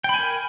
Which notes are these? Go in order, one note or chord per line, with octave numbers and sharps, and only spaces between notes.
A#4 G5 G#5 B5